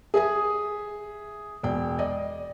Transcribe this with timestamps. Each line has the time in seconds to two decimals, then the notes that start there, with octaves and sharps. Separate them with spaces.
0.14 G#4 E5 G#5 D#6
1.63 E1 D5 G5
1.99 D5 D#5